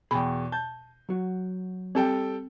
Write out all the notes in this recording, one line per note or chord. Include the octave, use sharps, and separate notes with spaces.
E2 B2 G#4 G5 B5
A5 G6
F#3 F#4
G3 C4 A4 G5